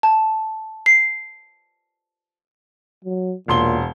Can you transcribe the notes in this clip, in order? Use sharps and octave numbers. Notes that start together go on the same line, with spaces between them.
A5
C7
F#3
E1 A#2 C6 G7